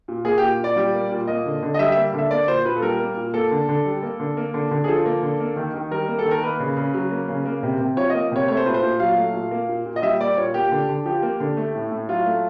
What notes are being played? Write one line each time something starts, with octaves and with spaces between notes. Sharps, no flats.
A#2
A#3 G#4
G4
A#2
A#2 D5
G3
A#3
A#2
A#3 D#5
D3
D3
D#5
G3 E5
E5
A#3
D3 E5
A#3 D5
A#2 C5
A#2 B4
A4
G3 A#4
A#3
A#2
A#3 A4
D3
D3
G3
A#3
D3
A#3
D3
D3
G#4
F3 A4
A#3
D3
A#3
D#3
D#3
G3 A#4
A#3
A4
D#3
A#4
A#3 B4
C#3
C#3
F#3
A#3
C#3
A#3
C3
C3
F3 C#5
D#5
A#3
C3 C#5
A3 C#5
C5
A#2 B4
C5
A#2
F#3 F5
A3
A#2
A#3
A#2
A#2
D#5
G3 E5
A#3 D5
A#2 C#5
A#3 G4
D3
D3
F3 G4
A#3
D3
A3
A2
A2
F#3 F4
A3